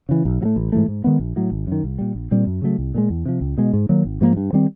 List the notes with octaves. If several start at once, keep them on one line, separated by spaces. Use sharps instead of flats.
C#3 E3
B1
A2 F#3 A3
A1
G#2 E3 A3
G#2
D#3 G#3 B3
A#1
A2 F#3
G#1
F#2 D#3
C2
A#2 G3
A#1
A#2 G3 C4
F#2
C#3 F#3 A3
C2
A#2 F3 G#3
E2
C3 F3
C#2
B2 G#3
G#2
D#3 F#3 A#3
G#1
G#2 F3 A#3
G2
D#3 G3 C4